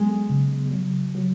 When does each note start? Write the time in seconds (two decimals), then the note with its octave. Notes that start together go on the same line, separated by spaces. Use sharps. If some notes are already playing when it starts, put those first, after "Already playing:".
Already playing: F#3 G#3 B3
0.30 C#3
0.71 F#3
1.15 F#3